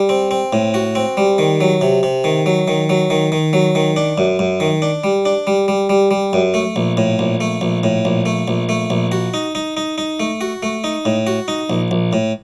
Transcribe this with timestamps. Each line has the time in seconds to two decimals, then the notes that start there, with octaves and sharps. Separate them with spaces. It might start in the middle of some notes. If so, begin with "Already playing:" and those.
Already playing: G3
0.09 C4
0.31 C4
0.53 A2
0.74 F#4
0.95 C4
1.17 G3
1.38 D#3
1.61 F#3
1.81 C3
2.03 C3
2.24 D#3
2.46 F#3
2.68 D#3
2.90 F#3
3.10 D#3
3.32 D#3
3.53 F#3
3.75 D#3
3.96 D4
4.18 F#2
4.39 F#2
4.60 D#3
4.82 D4
5.04 G3
5.25 D4
5.47 G3
5.68 G3
5.89 G3
6.11 G3
6.33 F#2
6.54 A3
6.76 A#1
6.97 A2
7.19 A#1
7.41 A3
7.61 A#1
7.83 A2
8.05 A#1
8.26 A3
8.48 A#1
8.69 A3
8.90 A#1
9.12 F#4
9.34 D#4
9.55 D#4
9.77 D#4
9.98 D#4
10.20 A3
10.41 F#4
10.63 A3
10.84 D#4
11.05 A2
11.27 F#4
11.48 D#4
11.70 A#1
11.91 A#1
12.13 A2